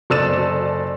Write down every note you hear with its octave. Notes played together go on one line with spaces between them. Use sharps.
F#1 A4 D5 E6 A6 E7